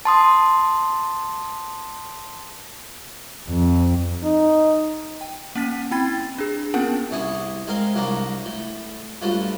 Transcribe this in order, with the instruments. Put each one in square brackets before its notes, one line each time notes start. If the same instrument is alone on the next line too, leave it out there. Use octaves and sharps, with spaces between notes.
[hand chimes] A5 C6 D#6
[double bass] F2
[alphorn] D#4
[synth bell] G5
A#3 C#4 B6 D#7
C4 E4 G5 B5 G#6 A6
A6
D4 G#4
A#3 B3 C#4 F4 A#4 F#5
[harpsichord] C2 E4 G#4 C#6 D#6
G#3 C4 A#4 F5
C2 F#3 A#3 D4 A#5
A2
G2 F3 F#3 A3